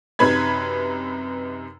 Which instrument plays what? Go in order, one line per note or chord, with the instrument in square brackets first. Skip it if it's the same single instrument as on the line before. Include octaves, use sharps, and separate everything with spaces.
[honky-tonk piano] F#2 C3 D#4 B4 B5 G#6